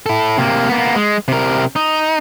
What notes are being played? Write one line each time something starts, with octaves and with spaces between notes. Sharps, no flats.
E4 A4
C3 A#3
A#3 B3
G#3
C3 A#4
D#4